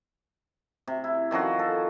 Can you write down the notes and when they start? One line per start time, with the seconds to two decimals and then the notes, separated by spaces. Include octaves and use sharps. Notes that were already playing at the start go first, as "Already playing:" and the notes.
0.88 C3
1.04 E4
1.31 D#3 F3 C#4 F#4
1.59 A4